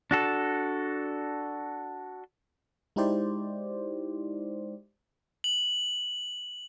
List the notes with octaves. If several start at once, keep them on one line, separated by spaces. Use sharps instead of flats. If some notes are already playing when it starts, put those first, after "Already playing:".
D4 F#4 A4
G#3 D#4 E4 G4 C5 D5
F#7